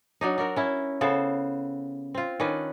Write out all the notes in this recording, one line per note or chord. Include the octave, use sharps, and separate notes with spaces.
F#3 D4 D#4
D4 F#4 A#4
C#4 E4
C#3 B3 A4 C5
C4 F4
D#3 C#4 D4 B4